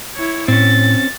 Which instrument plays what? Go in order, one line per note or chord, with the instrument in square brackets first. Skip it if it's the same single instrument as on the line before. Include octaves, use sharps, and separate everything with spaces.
[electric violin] E4 C#5
[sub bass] A2 [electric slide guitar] C4 C#4 [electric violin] A6